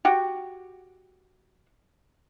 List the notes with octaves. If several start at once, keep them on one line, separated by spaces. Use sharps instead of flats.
F#4 G4